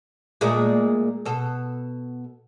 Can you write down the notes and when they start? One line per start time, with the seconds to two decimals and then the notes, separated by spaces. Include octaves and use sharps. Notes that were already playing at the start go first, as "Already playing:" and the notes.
0.41 A#2 G#3 A3
1.26 B2 A4